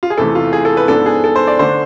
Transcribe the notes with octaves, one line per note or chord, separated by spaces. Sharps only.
F4
G#4
E2 C3 E3 A3 A4
F4
G#4
A4
B4
G#2 F3 B3 D4 A4
G#4
A4
C5
D5
D3 A3 D4 C5